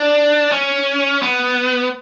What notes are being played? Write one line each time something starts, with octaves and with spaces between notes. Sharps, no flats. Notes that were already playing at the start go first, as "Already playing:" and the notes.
Already playing: D4
C#4
B3